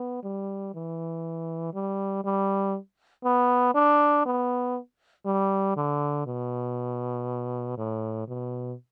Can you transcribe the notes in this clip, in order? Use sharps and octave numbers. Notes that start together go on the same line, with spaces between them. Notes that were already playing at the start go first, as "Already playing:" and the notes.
Already playing: B3
G3
E3
G3
G3
B3
D4
B3
G3
D3
B2
A2
B2